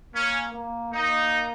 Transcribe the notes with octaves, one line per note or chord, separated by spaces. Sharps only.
A#3 C#4
A#3
A#3 D#4